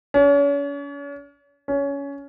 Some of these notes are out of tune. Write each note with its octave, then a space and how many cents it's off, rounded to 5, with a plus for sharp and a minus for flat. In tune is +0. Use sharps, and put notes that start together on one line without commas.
C#4 +40
C#4 +20